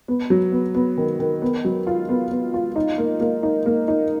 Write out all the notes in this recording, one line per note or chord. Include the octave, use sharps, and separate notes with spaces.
B3
F#3
B3
B3
D#3
D#3
B3
F#3
F4
B3
B3
F4
D#4
A#3
A#3
D#4
A#3
D#4